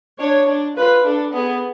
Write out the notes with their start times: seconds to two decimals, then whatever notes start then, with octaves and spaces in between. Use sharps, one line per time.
0.19 D4 C#5
0.48 D4
0.77 F4 B4
1.05 D4 A4
1.34 B3 G#4